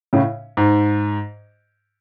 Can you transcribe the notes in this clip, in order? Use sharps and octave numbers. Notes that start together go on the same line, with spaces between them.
A2 C#3
G#2